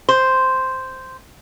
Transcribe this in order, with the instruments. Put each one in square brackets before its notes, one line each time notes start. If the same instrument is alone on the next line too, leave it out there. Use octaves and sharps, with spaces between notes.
[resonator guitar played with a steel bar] C5